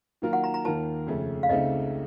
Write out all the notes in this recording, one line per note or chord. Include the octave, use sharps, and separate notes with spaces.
D#3 F#3 A#3 F4 A#4
F#5
A#5
A#5
D#2 D#3 A#3 F4 A#4 A5
F2 C#3 A3
F5
C#2 C#3 A3 C4 D#4 D#5